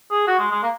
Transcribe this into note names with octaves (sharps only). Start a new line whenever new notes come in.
G#4
F#4
G#3
G#3
A#3